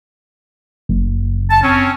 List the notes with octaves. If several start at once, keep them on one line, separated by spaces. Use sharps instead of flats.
F#1
A5
C4 C#4